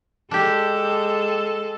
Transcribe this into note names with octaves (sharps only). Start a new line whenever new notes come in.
G#3 D4 G4 A4